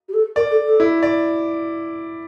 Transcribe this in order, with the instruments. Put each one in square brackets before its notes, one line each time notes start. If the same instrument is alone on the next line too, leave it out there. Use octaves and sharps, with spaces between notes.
[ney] G4
A4
[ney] A#4 [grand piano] D5
[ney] A4
A4
[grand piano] E4
D5